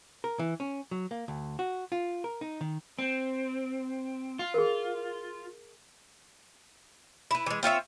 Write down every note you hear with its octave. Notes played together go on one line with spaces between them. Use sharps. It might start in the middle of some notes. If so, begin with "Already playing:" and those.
A#4
E3
C#4
F#3
A#3
D2
F#4
F4
A#4
D#4
D#3
C4
F4
G#4 A#4
E4 B4
E3 G#3
C4 F4 C#5 E5